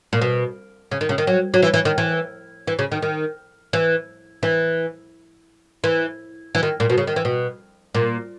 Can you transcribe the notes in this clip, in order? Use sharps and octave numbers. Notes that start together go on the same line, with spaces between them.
A#2
B2
C#3
D#3
C#3
D#3
F#3
F#3
E3
E3
D#3
E3
E3
C#3
D#3
D#3
E3
E3
E3
E3
D#3
A#2
B2
C#3
D#3
E3
B2
A#2